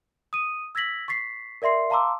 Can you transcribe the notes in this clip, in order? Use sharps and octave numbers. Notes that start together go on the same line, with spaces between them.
D#6 D#7
E6 G#6 A#6 B6 F#7
C#6 A6 B6 C7
A#4 D5 E5 C6 C7
F5 A5 A#5 C6 D6 E6